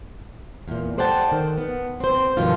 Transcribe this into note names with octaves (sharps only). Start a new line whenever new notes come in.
E2 A#2
A4 C5 D5 F#5 G5 A5
D#3
B3
C4 C5
G2 B2 D#3 F3 D4 F4